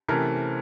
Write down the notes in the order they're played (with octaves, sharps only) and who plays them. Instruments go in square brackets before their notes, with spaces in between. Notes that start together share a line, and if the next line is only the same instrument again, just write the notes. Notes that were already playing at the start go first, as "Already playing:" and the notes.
[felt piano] C3 E3 A3 C#4 A#4